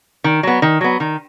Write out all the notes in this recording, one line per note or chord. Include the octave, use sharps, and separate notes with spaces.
D#3
F#3 B3
D#3
F#3 B3
D#3